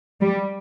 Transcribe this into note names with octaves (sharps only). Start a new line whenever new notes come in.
G3